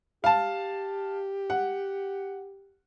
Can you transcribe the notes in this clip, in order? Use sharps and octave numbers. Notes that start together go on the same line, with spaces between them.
G4 F5 A5
F#5